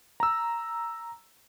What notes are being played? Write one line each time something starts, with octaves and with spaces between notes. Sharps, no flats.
A#5 E6